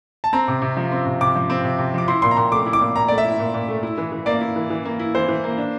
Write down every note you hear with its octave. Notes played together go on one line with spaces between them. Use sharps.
A5
C4 A#5
C3
C3
F3
C4
C3
C3 D6
F3
C4
C3
C3
F3 D6
E4 C6
A#2 C6
A#5
A#2 C6
A3 D6
E4
D6
A#2
A#2 A#5
A3 D5
E5
E4
A#2
A#2
A3
E4
E3
E3
A#3 D5
E4
E3
E3
A#3
E4
E3 C5
E3
A#3
D4